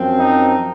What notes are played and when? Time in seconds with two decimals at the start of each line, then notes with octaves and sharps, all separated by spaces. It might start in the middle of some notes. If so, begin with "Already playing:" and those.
Already playing: F#2 F3 C4
0.18 D#4